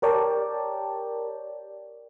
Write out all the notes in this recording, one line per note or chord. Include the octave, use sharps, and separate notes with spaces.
G4 A#4 C#5 D5 G5 A5